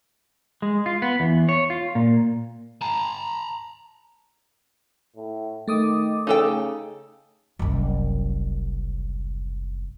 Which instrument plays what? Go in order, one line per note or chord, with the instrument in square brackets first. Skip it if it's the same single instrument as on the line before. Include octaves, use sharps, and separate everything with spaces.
[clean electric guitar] G#3
F4
B3
E2
C#5
F4
A#2
[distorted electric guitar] A5 A#5
[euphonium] A2
[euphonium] D#3 [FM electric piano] A3 D6 D#6
[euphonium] C#3 [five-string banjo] D#4 A4 G5
[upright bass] F#1 C2